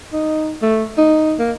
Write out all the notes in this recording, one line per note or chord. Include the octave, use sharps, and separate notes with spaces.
D#4
A3
D#4
A#3